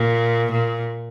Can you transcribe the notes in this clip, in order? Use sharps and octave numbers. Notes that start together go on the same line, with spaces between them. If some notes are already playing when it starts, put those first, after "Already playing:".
Already playing: A#2
A#2